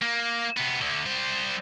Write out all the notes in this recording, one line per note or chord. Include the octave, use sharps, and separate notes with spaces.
A#3
C3 B3
D2 D3
G3 C5